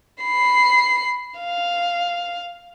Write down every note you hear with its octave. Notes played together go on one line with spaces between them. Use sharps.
B5 C7
F5